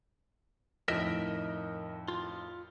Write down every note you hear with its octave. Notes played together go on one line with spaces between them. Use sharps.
F2 A2 D#3 A#4 D#5 E5
F4